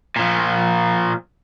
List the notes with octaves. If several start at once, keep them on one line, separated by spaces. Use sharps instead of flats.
A#2 F3